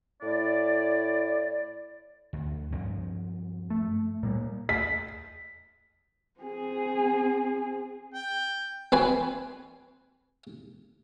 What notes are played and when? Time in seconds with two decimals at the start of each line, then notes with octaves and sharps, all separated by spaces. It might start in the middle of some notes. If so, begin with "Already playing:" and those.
0.22 A2 E4 D5
2.33 D2
2.72 G2 F3 C4
3.70 A3
4.23 A#2 G3 A#3
4.69 B6
6.40 C4 G#4
8.14 G5
8.92 C4 B4 G#5